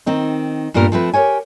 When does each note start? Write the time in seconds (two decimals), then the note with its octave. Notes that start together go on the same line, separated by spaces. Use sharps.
0.06 D#3 C4 D#4
0.74 G2 A#2 G3 B3 A#4
0.92 F3 A3 C4 B4
1.14 G4 A#4 C#5 G#5